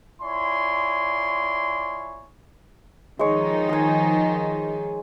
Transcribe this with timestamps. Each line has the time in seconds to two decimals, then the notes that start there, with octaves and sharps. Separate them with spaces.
0.21 E4 F4 C#5 D5 G#5 C6
3.19 D#3 F3 G#3 D#4 C#5
3.69 G#4 G#5